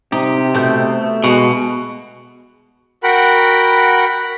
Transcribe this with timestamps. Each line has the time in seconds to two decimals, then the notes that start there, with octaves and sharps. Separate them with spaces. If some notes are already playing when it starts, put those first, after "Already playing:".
0.12 C3 D#4 G4
0.54 B2 A3 G6
1.24 B2 G#3 F#4
3.03 F#4 A#4 F#5 G5 B5